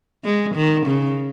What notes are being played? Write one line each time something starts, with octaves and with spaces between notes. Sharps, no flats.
G#3
D#3
C#3